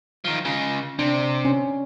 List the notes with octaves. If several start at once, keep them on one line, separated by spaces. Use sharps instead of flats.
D#3 F3
C#3 G#3
C3 D4
C#4